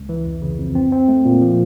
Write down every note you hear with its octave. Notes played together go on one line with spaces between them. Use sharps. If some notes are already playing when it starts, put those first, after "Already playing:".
Already playing: C#2
E3
F2
C#3
F2
C4
C4
A3
A#2
F3